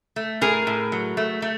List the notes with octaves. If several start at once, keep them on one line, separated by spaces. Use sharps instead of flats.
A3
A2 G#4 A#4
A2
F#3
A3
A3